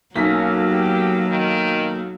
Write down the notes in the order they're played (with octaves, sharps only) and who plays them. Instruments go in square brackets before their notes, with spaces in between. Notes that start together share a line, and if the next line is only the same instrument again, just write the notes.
[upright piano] B1 B6 [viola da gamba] F#3 [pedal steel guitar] A#3 [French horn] C#4
[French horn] G4
D#3